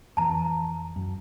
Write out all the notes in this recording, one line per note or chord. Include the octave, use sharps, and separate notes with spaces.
F2 E3 A5 A#5
F#2